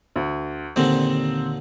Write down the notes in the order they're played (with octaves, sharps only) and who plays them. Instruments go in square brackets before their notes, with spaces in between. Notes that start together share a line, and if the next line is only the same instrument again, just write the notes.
[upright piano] D2
[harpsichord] D#2 A#2 D3 [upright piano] C4